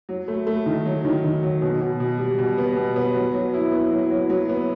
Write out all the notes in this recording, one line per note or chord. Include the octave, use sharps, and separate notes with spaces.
F#3
A3
A3
D#3
F#3
D#3
D#3
F#3
B2
B2
B2
G3
B2
B3
B2
B3
F#3
F#3
E4
B3
F#3
F#3
F#3
B3